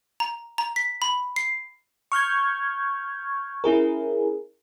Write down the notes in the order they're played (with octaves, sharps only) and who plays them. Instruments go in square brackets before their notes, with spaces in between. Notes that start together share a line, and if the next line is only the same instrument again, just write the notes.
[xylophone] A#5
A#5
B6
B5
C7
[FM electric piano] C#6 F6 G6 G#6
C#4 E4 G#4 A#4